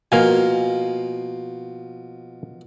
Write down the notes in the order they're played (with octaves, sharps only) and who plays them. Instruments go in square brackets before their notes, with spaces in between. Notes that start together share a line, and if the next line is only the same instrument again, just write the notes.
[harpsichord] B2 F3 [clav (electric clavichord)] A#3 F5 G#5